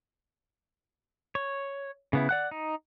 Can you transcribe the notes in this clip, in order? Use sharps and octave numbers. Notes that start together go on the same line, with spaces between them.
C#5
C#3 B3 E4
D5 F#5 F#6
D#4